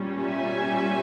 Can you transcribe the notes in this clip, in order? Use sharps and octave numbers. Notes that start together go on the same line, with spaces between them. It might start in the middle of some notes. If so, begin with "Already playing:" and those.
Already playing: A#2 G3 C#4
E5 G#5